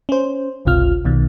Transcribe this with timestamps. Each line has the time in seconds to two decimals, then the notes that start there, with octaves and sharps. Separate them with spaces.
0.09 C#4 C5
0.65 G1 C#2 C3 F4 F6
1.05 B1 B2 D#3